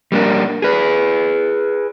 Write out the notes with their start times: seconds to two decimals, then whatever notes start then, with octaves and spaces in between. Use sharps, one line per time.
0.12 G3 A#3 D4 A#4
0.62 G#4 B4